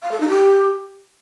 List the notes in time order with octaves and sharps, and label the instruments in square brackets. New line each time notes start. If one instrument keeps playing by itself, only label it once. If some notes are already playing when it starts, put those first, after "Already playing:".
[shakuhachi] F5
A4
D#4
G4